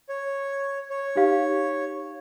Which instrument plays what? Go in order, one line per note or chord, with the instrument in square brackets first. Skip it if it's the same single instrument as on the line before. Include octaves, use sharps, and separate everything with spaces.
[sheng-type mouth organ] C#5
C#5
[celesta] D#4 G4 F5